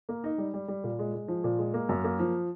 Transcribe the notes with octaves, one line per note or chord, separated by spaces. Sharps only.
A#3
D#4
G3
G3
G3
A#2
G#3
G#3
F3
A#2
G#3
A#3
F#2
A#3
F3